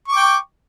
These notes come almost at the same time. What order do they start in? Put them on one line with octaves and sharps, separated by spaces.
C#6 D6 G5